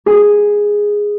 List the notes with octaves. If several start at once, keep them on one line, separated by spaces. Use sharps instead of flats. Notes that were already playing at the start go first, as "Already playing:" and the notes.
G#4